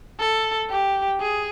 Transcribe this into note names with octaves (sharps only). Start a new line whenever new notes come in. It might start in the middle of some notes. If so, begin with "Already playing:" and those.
A4
G4
G#4